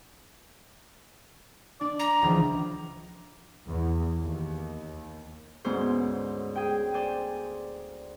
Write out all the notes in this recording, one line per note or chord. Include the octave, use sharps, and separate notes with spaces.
D4 D5
A#5
C#2 E3 F3
E2
D#2
D2 G#2 G#3 B3 C#4 C5
G#4 G5
C5 D5 G#5